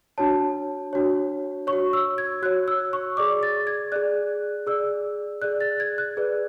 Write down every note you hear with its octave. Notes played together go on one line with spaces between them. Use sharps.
D4 F#4 C#5 A5
D4 F#4 C#5
C#5 C#6
F#4
E6
G#6
F#4 C#5 F#6
E6
C#6
G#4 D5 D6
A6
G#6
G#4 D5 F#6
G#4 D5 E6
G#4 D5 F#6
A6
G#6
F#6
G#4 B4 D5